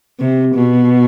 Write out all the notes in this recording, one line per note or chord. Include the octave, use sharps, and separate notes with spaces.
C3
B2